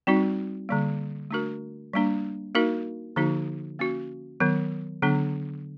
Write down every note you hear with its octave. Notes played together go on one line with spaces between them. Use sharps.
G3 C4 D#4 F#4
D3 G3 A#3
A3 D4 F#4 A#4
G3 A#3 D4
A#3 D#4 F#4 A#4
D3 F3 A#3 D#4 F#4
A#3 C#4 F#4
D#3 F#3 B3
D3 F#3 B3 D4